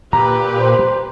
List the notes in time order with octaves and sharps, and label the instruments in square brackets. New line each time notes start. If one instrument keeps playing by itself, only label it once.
[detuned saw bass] A#2 [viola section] G4 B4 [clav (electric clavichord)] A#5
[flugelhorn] C5